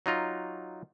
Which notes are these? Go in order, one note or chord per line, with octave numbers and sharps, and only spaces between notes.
F#3 D#4 F4 A#5